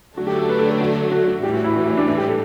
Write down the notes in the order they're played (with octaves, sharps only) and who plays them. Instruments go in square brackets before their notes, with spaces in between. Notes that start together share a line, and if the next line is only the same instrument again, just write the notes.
[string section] D3 F#3 A3 D4 [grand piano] F#4
[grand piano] G4
A4
B4
A4
A4
F#4
F#4
F#4
[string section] A2 E3 G3 [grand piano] G4
[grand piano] F#4
E4
F#4
E4
D4
D4
G4
A4